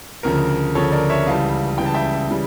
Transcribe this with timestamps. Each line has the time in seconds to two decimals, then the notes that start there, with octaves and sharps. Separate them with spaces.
0.23 D2 C#3 F3 A#4
0.75 D2 C#3 F3 A4 C#5
0.92 A#4 D5
1.10 C#5 E5
1.27 C#2 C#3 E3 G3 F5 A5
1.78 C#2 C#3 E3 G3 G5
1.86 A5
1.94 E5 G5
2.31 C#3 E3 G3